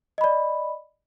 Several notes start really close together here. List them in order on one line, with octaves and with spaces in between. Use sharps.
D#5 B5 D5